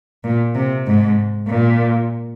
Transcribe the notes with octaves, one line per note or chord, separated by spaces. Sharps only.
A#2
C3
G#2
A#2